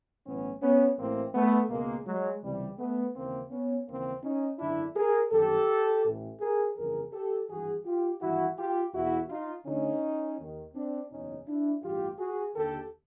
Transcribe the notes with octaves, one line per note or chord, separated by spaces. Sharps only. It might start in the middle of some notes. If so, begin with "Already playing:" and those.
B1 A2 E3 B3 C#4
B3 C#4
A1 A2 E3 A#3 C4
A3 B3
C#2 B2 G#3 A#3
F#3 G#3
C#2 C3 E3 G3
A3 B3
D#2 C#3 E3 A#3 C4
B3 C#4
D#2 C#3 E3 A#3 C4
C#4 D#4
G#1 F#2 D3 D4 E4
G#4 A#4
G1 F#2 D#3 G4 A4
A1 A2 E3
G#4 A#4
G1 F2 C#3 E3 G#4 A#4
G4 A4
G#1 G2 E3 F#4 G#4
F4 G4
G#1 G2 E3 E4 F#4
F4 G4
E2 B2 E4 F#4
D#4 F4
D2 D3 C#4 D#4
D#2 D#3
C4 D4
F#1 E2 B2 C#4 D#4
D4 E4
A1 G2 E3 F4 G4
F#4 G#4
D#2 D3 G4 A4